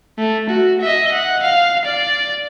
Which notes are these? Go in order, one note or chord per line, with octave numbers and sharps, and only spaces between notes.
A3
F#4
D#5 E5
F#5
F5
D5